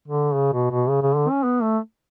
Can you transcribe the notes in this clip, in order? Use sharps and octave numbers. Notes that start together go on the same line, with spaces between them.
D3
C#3
B2
B2
C#3
C#3
D3
C#4
B3
A3